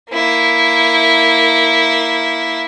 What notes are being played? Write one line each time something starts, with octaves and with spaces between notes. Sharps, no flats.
A#3 E4